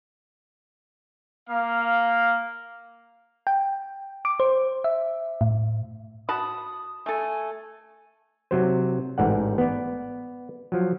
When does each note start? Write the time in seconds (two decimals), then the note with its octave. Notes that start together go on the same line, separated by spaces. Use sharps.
1.49 A#3 F5
3.47 G5
4.25 D6
4.40 C5
4.84 E5
5.41 A2
6.29 F#4 A5 B5 D#6
7.06 A3 A4 G#5
8.51 C3 F#3 C5
9.18 A1 G#2 D5 F#5
9.58 B3 D5
10.72 F3 F#3